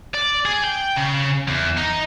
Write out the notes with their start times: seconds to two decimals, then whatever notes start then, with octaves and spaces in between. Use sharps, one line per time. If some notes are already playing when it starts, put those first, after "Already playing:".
0.14 D5
0.45 G#4
0.64 G5
0.96 C#3
1.48 E2
1.77 D#4